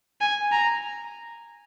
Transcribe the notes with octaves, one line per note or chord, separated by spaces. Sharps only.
G#5
A#5